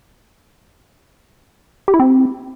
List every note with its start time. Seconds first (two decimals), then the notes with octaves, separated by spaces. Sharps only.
1.88 G4
1.94 E4
2.00 C4